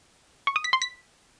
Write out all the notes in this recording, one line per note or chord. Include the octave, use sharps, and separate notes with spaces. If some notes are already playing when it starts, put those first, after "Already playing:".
C#6
D#6
B6
C6
B6